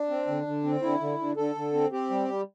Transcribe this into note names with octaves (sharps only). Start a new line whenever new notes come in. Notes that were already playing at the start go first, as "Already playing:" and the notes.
Already playing: D4
C4
D3
D3
C4
D3 E4
D3
D3
D3 A4
D3
C4
C4 G4
G3
G3